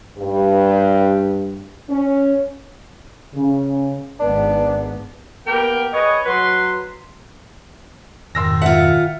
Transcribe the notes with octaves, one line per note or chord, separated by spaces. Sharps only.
G2
C#4
C#3
G#1 G#2 B3 D4
A#3 B3 G4 A#4 G5
G#4 B4 C#5 D#5
F#3 B4 C6
F2 G#2 B2 D#3 C6 E6 A#6
F4 E5 F#5